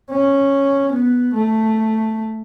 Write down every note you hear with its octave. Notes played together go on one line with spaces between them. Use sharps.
C#4
B3
A3